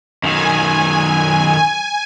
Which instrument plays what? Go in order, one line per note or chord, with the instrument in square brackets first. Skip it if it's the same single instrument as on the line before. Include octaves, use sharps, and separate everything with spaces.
[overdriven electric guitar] F#2 D#3 [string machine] G#5